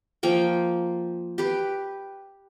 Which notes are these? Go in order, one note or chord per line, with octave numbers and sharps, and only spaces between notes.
F3 A#3 G5
G4 B4